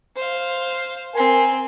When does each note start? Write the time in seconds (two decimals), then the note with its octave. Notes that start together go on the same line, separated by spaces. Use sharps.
0.16 C5 F5
1.15 C4 A#4 G#5 C6